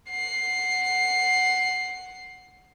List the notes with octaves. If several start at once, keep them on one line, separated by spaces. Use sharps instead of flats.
F#5 C7